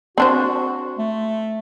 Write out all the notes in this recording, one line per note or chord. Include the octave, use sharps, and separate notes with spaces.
C4 D4 F#4 C5
A3